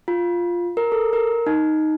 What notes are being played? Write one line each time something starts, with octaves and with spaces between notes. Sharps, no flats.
F4
A#4
A4
A#4
D#4